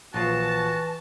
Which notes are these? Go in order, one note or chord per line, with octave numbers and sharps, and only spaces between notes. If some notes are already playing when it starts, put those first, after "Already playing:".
A#1 E3 F4 F#4 C#5 A5